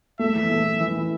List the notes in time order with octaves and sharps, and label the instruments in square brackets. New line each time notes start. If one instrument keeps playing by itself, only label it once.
[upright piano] A3 [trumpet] E5
[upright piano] E3
A3
E3
E3
E4